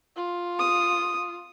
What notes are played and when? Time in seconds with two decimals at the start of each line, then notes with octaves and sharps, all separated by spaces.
0.16 F4
0.59 D#6